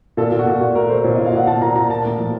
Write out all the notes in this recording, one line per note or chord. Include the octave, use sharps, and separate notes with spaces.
A#2 A4
A#2
F#4
A#2
A#2 F#4
A3 A#4
A3 C5
A#2 C#5
D#5
A#2
F5
A#2 F#5
A#2 A5
A#2 A#5
A#2 A#5
A#3 A5
A2
F3